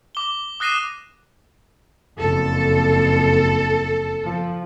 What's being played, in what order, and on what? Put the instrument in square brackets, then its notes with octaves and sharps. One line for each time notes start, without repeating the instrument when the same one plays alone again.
[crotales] D6 G7
D#6 F#6 A#6 C7 D#7 E7
[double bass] F#1 F2 [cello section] A4
[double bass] F3